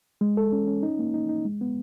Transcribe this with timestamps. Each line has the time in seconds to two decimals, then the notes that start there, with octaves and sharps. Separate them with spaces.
0.21 G#3
0.37 A4
0.52 C#4
0.67 C#4
0.83 D#4
0.99 A#3
1.14 D#4
1.29 D#4
1.45 G#3
1.61 B3